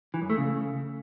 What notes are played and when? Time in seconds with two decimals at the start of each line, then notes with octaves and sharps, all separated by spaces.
0.14 E3
0.22 F#2
0.30 A3
0.38 C#3